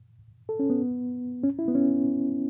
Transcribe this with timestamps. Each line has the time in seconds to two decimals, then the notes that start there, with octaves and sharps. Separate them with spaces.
0.49 A4
0.59 C#4
0.70 B3
1.44 C#4
1.59 E4
1.68 B3
1.75 C#4